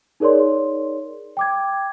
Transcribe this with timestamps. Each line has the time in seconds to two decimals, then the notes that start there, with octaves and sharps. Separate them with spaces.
0.20 D#4 G#4 A#4 C#5 D5 C6
1.37 G5 D6 G#6